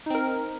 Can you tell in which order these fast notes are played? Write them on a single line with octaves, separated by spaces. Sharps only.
D#4 C4 A#4